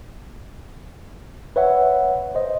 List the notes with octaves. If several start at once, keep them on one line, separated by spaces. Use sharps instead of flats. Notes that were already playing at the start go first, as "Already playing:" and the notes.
B4 C#5 E5 F#5
C5 D#5